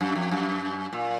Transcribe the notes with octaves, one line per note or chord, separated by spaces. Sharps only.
F#2
F2
F#2
A#2